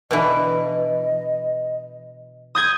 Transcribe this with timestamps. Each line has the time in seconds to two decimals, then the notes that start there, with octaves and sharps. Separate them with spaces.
0.11 B2 D3 E3 D#5
2.55 D#6 G6 G#6